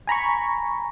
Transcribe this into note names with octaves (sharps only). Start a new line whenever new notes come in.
G#5 A#5 B5 C#6